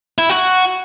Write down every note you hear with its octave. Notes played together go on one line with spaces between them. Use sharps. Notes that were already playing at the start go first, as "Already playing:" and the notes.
E4
F#4